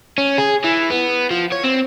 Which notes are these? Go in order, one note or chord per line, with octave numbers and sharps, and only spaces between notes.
C#4
G#4
E3
B3
F3
C#5
C4